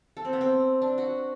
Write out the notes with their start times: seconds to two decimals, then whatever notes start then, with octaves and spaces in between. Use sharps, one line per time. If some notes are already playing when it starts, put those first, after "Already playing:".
0.17 A4
0.25 C4
0.33 B3
0.41 C4
0.82 D4
0.98 F#4